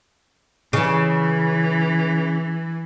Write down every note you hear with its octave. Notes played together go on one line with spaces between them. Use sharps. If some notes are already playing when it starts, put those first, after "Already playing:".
C#3 E3